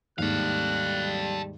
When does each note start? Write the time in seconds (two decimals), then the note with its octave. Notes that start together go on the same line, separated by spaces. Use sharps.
0.18 D#2 G#2 G3 A4 F5 F#6